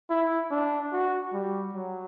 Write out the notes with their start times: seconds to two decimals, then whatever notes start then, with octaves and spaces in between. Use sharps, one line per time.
0.11 E4
0.51 D4
0.93 F#4
1.33 G3
1.74 F#3